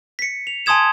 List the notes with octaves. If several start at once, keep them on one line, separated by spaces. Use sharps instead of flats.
B6 C#7
F7
G#5 A5 C6 D#6 G#6 E7